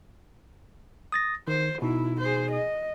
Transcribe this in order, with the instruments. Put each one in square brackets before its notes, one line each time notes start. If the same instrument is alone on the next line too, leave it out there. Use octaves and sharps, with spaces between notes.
[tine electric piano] D#6 A6 A#6
[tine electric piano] D#3 [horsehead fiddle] C5
[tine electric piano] B2 D#4 [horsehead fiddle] E4
[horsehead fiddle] G#4 C5
D#5